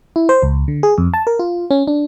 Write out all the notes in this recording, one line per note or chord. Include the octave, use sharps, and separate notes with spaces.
E4
C5
C#2
D3
G#4
F2
A5
A#4
F4
C#4
D4